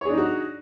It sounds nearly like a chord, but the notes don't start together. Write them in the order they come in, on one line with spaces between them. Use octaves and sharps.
C#5 G#4 D4 D#4 F#4